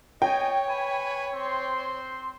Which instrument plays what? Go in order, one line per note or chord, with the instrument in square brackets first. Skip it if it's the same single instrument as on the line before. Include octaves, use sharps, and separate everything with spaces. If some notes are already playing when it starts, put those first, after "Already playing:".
[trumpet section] B3 D#5 G#5 [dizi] C#5 [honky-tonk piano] G5
[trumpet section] B4 G#5 B5
C4 C5 C6